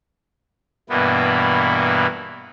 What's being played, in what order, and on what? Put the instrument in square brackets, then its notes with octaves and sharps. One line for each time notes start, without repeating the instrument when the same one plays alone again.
[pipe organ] G2 B2 E3 A#3 B3